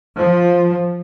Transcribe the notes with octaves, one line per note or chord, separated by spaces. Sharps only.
F3